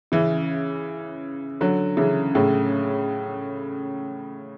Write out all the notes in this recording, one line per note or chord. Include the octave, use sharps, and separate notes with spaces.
C#3 E3
D3 F#3
C#3 E3
A2 C#3